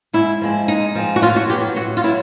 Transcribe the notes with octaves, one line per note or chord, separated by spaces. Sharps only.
G#2 E4
F3 G#3 C4
G#2 D#4
F3 G#3 C4
F#4
A2 F4
F#4
F#3 B3 G4
A2 F#4
F4
F#3 E4